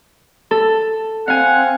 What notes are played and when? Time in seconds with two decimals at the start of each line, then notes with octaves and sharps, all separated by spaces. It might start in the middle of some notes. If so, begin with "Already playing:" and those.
0.51 A4
1.28 C4 F5 F#5 G#5